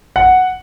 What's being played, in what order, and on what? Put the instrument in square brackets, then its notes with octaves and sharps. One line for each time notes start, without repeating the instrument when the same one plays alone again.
[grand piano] F#5